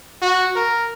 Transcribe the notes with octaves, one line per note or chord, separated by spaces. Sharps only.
F#4
A#4